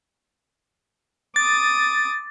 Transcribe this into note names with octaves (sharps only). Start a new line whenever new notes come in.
D6 D#6 A6